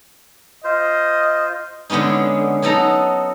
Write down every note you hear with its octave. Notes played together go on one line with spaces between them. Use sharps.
F4 C5 D#5
D3 G#3 B3 C#4 D#4
F#3 B3 D#4 A4 A#5